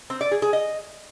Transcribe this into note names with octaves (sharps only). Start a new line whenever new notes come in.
C4
D5
G#4
G#4
D#5